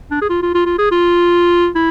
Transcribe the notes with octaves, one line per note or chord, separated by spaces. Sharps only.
D4
G#4
F4
F4
F4
F4
G#4
F4
E4